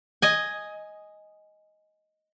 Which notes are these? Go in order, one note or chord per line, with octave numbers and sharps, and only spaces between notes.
D#5 G#5